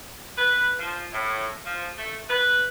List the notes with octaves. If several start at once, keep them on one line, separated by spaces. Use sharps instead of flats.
B4
F3
A2
F3
A3
B4